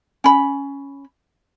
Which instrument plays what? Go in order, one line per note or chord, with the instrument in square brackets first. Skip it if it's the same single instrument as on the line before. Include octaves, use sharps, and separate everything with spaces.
[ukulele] C#4 B5